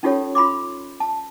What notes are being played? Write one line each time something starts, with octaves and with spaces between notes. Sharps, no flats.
C#4 D#4 F4 G4 A4 C#5
F4 B5 C6 D6
A5